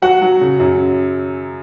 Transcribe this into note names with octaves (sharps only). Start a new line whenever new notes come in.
F#3 F#4 F#5
F#3
C#3
F#2